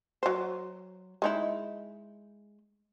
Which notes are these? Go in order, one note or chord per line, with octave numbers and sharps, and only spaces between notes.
F#3 C5
G#3 D#4 E4